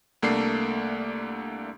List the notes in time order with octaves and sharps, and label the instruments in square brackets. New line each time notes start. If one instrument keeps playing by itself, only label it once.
[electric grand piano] C2 A3 A#3 D4 C7